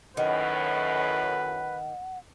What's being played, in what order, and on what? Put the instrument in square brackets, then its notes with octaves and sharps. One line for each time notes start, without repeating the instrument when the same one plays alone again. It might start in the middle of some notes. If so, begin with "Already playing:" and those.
[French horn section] F#2 A2 [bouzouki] D#3 [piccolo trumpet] B4 [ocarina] F#5